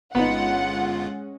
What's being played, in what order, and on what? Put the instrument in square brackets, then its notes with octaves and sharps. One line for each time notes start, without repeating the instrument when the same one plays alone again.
[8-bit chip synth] G1 F4 [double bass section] G#3 C#4 [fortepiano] B3 D#4 [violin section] F#5